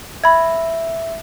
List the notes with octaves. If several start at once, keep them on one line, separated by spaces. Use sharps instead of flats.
E5 B5 G#6